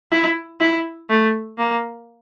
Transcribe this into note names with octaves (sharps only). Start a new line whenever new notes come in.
E4
E4
A3
A#3